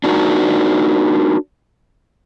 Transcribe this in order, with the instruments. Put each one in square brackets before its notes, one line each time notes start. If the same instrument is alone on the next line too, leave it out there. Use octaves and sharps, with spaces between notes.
[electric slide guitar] D4 D#4 F#4 A#4